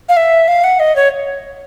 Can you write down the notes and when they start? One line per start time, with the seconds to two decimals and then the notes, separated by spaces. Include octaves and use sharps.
0.09 F5
0.17 E5
0.48 F5
0.64 F#5
0.79 D#5
0.96 C#5